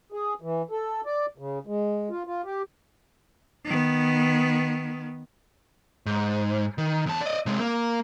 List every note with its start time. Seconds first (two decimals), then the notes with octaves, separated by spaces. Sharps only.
0.12 G#4
0.42 E3
0.71 A4
1.06 D5
1.38 C#3
1.67 G#3
2.10 F4
2.27 F4
2.45 G4
3.65 D#3 B3
6.06 G#2
6.78 D#3
7.06 E2 A5
7.21 D5 D#5
7.46 C3 G#3
7.60 A#3